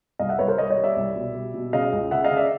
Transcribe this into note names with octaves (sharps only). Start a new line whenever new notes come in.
C2 D#5 F5
E5 F#5
C2 B4 C#5
A#4 C5
G3 C#5 D#5
C#5 D#5
G3
D5 E5
C2
B2
G3
B2
C#3 D#5 F5
C#2
C#3 E5 F#5
D#5 F5
C#3
D5 E5